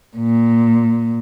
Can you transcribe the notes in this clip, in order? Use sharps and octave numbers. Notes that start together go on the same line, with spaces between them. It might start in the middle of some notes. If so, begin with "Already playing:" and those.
A#2